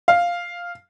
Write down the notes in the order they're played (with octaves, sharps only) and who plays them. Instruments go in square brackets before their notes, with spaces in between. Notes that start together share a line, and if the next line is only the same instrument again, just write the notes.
[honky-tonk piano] F5